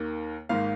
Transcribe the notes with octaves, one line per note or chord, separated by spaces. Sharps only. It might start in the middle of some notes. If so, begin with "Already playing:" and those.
Already playing: D#2 D#3 A#3
G#1 G#2 D#3 A#3 F5